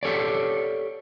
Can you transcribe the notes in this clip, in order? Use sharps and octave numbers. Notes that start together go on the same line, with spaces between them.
G4 A4 C#5 D5